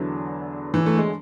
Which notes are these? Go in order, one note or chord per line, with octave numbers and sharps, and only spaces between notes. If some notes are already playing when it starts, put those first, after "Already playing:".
Already playing: E2 D3 F#3 B3 E4
E3
A3
G#3